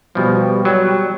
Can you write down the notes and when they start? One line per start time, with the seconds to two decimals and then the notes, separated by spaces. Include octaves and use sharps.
0.15 B2 F3 G3
0.65 F#3 G3